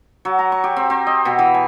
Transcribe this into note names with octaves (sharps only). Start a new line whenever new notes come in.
F#3
A#5
C#6
G4
C4
C4
D#5
B2
E3
G#5